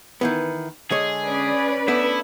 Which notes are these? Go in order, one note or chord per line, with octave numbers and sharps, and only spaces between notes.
D#3 E3 B3
D3 G#3 G#4 C#5
C#4 B4 D5
A3 B3 D4 E4